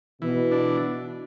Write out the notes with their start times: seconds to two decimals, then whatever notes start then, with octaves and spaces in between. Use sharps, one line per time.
0.22 B2 E3
0.52 D4